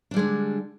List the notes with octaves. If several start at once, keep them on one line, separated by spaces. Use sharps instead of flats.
D3 G3 G#3 D4